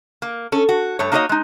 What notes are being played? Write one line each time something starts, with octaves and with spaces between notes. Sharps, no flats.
A#3
C#4 A4
F#4
G2 A3 C#5
A#3 D#4 F#4 A#4 C#5 D#5
G#3 D#4